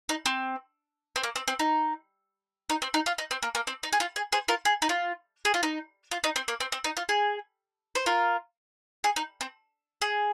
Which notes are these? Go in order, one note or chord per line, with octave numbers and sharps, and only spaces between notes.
D#4
C4
C4
A#3
C4
C4
D#4
D#4
C4
D#4
F4
D#4
C4
A#3
A#3
C4
D#4
G#4
F4
G#4
G#4 C5
F4 A#4
G#4
D#4
F4
G#4
F4
D#4
F4
D#4
C4
A#3
C4
C4
D#4
F4
G#4
C5
F4 A#4
G#4
D#4
C4
G#4